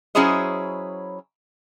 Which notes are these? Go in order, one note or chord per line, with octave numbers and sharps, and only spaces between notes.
F#3 C#4 E4 G#4 C5 D#5